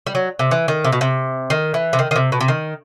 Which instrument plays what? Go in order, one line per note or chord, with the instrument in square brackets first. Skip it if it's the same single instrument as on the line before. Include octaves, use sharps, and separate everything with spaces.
[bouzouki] G3
F#3
C3
E3
D#3
C3
B2
C3
D#3
E3
C3
D#3
D#3
C3
B2
C3
D#3